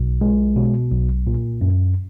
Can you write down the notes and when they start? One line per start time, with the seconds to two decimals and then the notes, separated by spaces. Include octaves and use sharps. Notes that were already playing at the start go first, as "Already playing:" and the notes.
Already playing: B1 B2
0.21 G#3
0.56 B2
0.91 B1
1.27 A#2
1.61 F#2